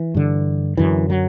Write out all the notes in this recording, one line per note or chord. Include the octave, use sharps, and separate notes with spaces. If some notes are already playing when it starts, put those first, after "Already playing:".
Already playing: E3
G2 D3
F#2 D3 E3
F#3